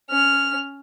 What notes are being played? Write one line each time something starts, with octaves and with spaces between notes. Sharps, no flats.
C#4 F6